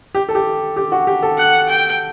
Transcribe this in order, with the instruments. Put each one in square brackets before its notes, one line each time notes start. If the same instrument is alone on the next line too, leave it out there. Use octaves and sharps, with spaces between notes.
[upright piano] G4
A4
G4
G4
F#4
G4
A4
[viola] F#5
G5